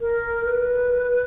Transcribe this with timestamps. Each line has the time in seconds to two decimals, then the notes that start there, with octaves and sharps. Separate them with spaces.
0.01 A#4
0.45 B4